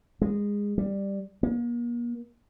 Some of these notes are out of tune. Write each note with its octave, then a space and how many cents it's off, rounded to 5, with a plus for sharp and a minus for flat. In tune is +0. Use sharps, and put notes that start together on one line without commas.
G#3 -20
G3 +10
A#3 +40